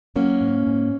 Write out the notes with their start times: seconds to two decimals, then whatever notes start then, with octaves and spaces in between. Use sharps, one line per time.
0.16 F#3 A#3 C#4
0.41 G#2
0.67 G#2